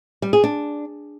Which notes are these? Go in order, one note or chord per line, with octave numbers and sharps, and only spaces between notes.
G3
G#4
D4